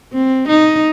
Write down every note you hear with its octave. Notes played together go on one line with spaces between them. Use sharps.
C4
D#4